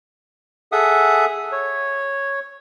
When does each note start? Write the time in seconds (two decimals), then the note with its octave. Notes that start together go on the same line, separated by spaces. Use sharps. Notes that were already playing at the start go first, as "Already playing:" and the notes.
0.72 G#4 A4 E5 F#5 D#6
1.52 C#5